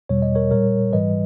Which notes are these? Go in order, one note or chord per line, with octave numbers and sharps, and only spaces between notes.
E2 B2 G3 C#5
D#5
A#4 C#5
A#2 G3 A#4 C#5
G#2 E3 G3 B4 D#5